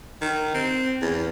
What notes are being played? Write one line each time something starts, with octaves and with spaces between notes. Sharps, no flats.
D#3
C4
E2